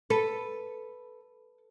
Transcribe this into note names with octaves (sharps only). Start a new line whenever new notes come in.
A4 B4